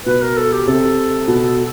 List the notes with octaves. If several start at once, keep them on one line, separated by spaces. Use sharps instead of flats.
B2 B4
A#4
A4
G4
C3 A4
B2